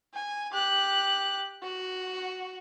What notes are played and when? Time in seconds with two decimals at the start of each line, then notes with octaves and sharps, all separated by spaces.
0.14 G#5
0.52 G4 F#6
1.63 F#4